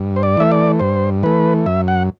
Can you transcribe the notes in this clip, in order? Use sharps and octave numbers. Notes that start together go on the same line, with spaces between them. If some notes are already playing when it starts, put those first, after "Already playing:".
Already playing: G2
C5
D5
E3 A3 E5
D5
G2 C5
E3 A3 B4
F#2 E5
F#5